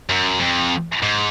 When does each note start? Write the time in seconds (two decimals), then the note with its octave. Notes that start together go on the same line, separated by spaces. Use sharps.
0.10 F#2
0.40 F2
1.03 G#2